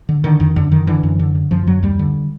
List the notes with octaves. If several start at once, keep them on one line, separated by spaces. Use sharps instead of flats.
D3
D3 D#3
F2 D#3
F#2 D3
D3 D#3
D3 E3
F#2
D3
D3
F#2 F3
F#2 F#3
D#2 G3
D3